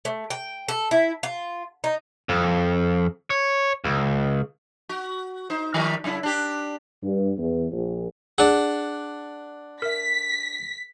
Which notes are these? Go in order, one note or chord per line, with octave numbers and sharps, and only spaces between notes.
A3
G5
A4
E4
F4
D#4
F2
C#5
C#2
F#4
D#4 C5
D#3 G3 A#4
F#2 C#3 E4
D4 G4
G2
E2
A#1
D4 G#4 F#5
A#4 E5 B6